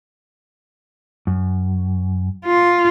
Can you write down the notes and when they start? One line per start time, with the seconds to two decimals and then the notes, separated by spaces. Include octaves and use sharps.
1.27 F#2
2.45 F4